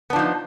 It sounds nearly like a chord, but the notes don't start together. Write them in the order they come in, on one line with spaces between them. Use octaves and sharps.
B3 D4 F3 D#4